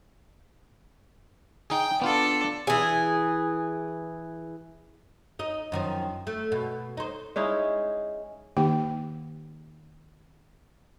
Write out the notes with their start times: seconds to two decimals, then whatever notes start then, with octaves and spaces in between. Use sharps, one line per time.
1.70 D#4 G#4 G5
2.02 B3 D4 F4 A4
2.67 E3 G#4
5.39 D#4 D#5
5.72 F#2 D#3 F3
6.27 A3
6.52 B2
6.97 D#4 C5
7.36 G#3 C#4 D#4 E4
8.57 D#3 A#3 D#4 G4 G5